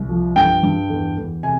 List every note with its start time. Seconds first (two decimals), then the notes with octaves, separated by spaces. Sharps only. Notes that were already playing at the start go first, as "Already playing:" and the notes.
Already playing: C2
0.09 F3
0.36 G2 G5
0.63 G2
0.90 E2
1.17 E2
1.43 C3 G#5